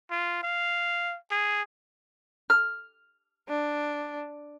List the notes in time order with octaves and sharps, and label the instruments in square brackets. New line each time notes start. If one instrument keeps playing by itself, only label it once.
[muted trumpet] F4
F5
G#4
[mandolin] F6
[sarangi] D4